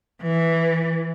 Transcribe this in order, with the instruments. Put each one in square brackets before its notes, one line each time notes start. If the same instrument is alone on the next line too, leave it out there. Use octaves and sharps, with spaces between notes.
[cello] E3